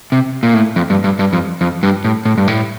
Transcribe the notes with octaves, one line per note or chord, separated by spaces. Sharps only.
C3
A#2
A2
F2
G2
G2
G2
F2
F2
G2
A2
A2
G2
A2